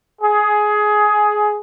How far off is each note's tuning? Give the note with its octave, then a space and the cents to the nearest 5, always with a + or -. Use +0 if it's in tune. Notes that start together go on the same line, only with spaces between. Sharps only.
G#4 +15